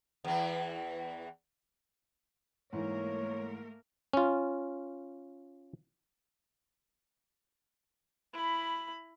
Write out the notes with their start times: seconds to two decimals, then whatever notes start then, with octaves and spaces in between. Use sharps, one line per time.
0.24 E2 E3
2.73 G#2 E3 A3 A#3 A#4 C#5
4.13 C#4 F4
8.34 E4 B5